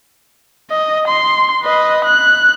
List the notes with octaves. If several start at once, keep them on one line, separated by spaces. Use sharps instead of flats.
D#5
C6
B4 D#5
F#6